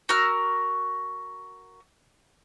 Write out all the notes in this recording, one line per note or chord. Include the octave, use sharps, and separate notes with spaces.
F#4 A#4 E6 F6